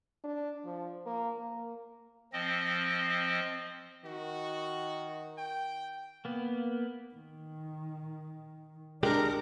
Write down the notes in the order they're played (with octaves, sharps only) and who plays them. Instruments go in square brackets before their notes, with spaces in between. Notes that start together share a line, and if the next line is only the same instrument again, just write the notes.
[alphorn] D4
F3
A#3
A#3
[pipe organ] F3 C4 D#5
[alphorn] D#3 [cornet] F#4
[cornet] G5
[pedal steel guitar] A#3 B3
[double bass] D#3
[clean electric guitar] D3 G#3 G4 [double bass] D4 [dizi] A#4